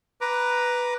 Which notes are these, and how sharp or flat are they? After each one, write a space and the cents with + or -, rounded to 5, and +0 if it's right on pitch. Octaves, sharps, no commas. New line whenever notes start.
B4 +0 A#5 +10 D6 +0